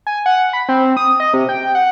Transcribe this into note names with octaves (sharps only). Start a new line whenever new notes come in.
G#5
F#5
B5
C4
D#6
D#5
C3
G5
F#5